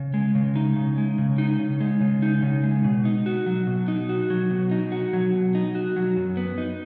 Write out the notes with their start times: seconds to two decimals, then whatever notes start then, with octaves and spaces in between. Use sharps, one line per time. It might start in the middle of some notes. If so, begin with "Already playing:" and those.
Already playing: C#3
0.14 G#3
0.35 C#3
0.56 D#4
0.76 C#3
0.98 G#3
1.18 C#3
1.38 D#4
1.59 C#3
1.80 G#3
2.01 C#3
2.22 D#4
2.43 C#3
2.63 G#3
2.84 B2
3.05 D#4
3.26 F#4
3.46 F#3
3.67 B2
3.88 D#4
4.09 F#4
4.30 F#3
4.51 B2
4.71 D#4
4.92 F#4
5.13 F#3
5.33 B2
5.55 D#4
5.75 F#4
5.96 F#3
6.17 F#2
6.37 B3
6.58 D#4